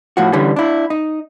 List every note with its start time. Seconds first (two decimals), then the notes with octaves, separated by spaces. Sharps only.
0.17 A2 F3 F#4
0.33 D3 E3 G3 C#4
0.56 D4 E4
0.90 D#4